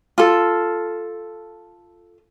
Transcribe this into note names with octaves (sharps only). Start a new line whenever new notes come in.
F4 A4